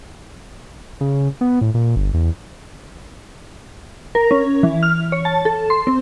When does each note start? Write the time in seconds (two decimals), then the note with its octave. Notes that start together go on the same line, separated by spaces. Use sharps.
1.01 C#3
1.41 B3
1.61 A2
1.74 A#2
1.96 G1
2.14 E2
4.15 A#4
4.31 C#4
4.63 E3
4.83 F6
5.12 C#5
5.25 A5
5.45 A4
5.70 C6
5.87 C4